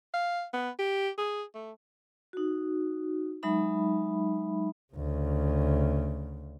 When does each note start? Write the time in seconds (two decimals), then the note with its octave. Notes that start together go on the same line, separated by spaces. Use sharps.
0.14 F5
0.54 B3
0.79 G4
1.18 G#4
1.55 A3
2.33 D#4 F#4
3.43 F#3 G#3 D#4 E5 B5
4.94 D2 C#3